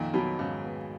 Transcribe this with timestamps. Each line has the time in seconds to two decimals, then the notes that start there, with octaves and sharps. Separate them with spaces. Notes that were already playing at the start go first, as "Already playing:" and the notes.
Already playing: F2 A#2 D#3
0.14 B2 F#3
0.39 G#2 C#3
0.64 B3